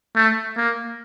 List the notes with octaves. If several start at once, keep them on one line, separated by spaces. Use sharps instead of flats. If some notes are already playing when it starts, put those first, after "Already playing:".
A3
A#3